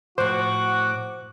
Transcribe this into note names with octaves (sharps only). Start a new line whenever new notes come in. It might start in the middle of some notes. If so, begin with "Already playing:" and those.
A2 F3 F#4 C5 F#5 D6